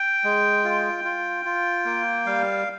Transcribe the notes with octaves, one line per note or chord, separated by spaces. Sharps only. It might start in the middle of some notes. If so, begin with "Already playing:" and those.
Already playing: G5
G#3
F4
F4
F4
A#3
G3 F5